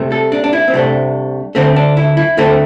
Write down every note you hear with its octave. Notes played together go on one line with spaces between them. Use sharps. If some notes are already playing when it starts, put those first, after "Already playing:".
Already playing: C2 C3 A3
A4
D4
D4
E4
C4
C2 C3 A3 D4
D2 D3 A3 C4
D4
E4
E4
D2 D3 A3 C4